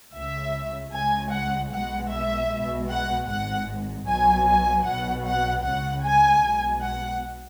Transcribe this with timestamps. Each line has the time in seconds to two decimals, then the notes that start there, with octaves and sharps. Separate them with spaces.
0.14 C#2 C#3 G#3 E5
0.93 C#2 C#3 G#3 G#5
1.32 F#5
1.71 B1 B2 G#3 F#5
2.10 E5
2.50 B1 B2 G#3
2.89 F#5
3.28 G#1 G#2 G#3 F#5
4.07 B1 B2 F#3 G#5
4.47 G#5
4.85 B1 B2 F#3 F#5
5.24 F#5
5.64 C#2 C#3 G#3 F#5
6.03 G#5
6.42 B1 B2 G#3
6.82 F#5